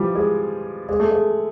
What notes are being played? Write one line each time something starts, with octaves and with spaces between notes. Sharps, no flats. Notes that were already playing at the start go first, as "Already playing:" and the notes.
Already playing: E3 F3 G3
G#3
G#3
A3
G#3